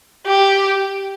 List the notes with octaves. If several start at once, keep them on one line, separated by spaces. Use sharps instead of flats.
G4